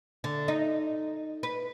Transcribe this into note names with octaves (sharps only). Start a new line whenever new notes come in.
D3
D#4
B4